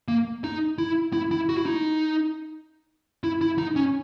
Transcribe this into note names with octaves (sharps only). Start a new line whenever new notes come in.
A#3
D#4
E4
E4
E4
F#4
E4
D#4
E4
E4
D#4
C#4